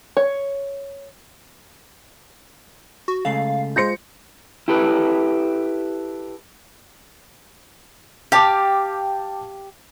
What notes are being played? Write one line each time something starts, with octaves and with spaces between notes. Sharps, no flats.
C#5
F#4
C#3 G#3 A3 F5
G#3 F4 C5 G6 A#6 C#7
E4 G4 A4 B4
G4 F5 G5 A5 D6